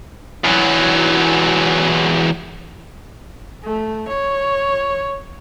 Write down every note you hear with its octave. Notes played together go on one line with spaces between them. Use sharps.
E2 F#3
A3
C#5